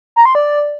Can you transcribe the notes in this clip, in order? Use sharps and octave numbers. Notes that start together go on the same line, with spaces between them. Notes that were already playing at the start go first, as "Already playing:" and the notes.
A#5
C6
D5